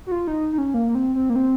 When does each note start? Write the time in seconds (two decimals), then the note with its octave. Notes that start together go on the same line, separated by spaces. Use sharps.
0.07 F#4
0.12 F4
0.27 D#4
0.53 D#4
0.58 C#4
0.74 A#3
0.88 A#3
0.95 C4
1.15 C4
1.30 A#3
1.36 C4